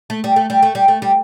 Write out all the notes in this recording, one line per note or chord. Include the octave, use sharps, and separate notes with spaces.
A3
G3
A3
G3
A3
G3
A3
G3